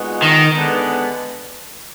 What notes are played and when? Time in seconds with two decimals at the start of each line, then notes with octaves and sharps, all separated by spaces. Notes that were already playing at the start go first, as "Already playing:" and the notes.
Already playing: A#2 G#3 B3 D#4 F#4
0.22 D#3
0.54 D3 G#3 B3